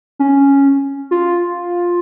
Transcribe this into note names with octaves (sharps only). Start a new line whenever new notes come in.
C#4
F4